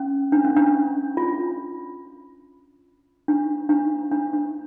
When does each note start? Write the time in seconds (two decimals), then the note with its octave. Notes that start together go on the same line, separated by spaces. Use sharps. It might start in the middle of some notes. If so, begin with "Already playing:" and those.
Already playing: C#4
0.32 D4
0.44 C#4
0.56 D4
1.17 F4
3.28 D4
3.69 D4
4.11 D4
4.33 D4